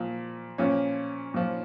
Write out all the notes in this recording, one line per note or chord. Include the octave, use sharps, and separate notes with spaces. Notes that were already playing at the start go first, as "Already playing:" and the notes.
Already playing: A#2 F3
A#2 F3 C#4
A#2 F3